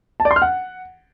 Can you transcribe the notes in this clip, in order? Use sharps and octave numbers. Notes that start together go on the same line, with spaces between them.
A5
D5
C6
F6
F#5